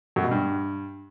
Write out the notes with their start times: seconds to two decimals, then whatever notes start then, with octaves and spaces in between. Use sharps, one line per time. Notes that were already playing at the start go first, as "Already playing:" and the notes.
0.16 F#2
0.24 B2
0.31 G2